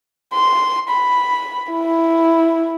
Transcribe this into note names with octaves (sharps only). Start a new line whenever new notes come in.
C6
B5
E4